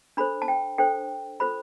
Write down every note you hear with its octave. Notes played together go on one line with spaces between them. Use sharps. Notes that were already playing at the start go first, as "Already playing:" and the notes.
D4 A4 C5 B5
A5
G5
D4 A4 C5 G5
F4 A4 C5 B5